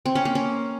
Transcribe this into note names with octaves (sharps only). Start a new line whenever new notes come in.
C4
C#4
A#3
C#4